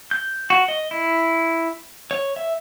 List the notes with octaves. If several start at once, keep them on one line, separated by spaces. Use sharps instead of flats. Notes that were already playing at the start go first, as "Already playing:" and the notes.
G6
F#4
D#5
E4
C#5
E5